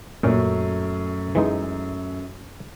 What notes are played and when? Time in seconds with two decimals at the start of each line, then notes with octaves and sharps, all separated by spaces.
0.23 F#2 A#2 A3 C#4
1.35 E3 G#3 D#4